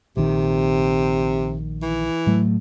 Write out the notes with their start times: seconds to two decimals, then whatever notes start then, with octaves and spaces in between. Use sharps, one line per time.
0.17 A#1 C3 D#3
1.82 E3
2.27 A2 F#3 A3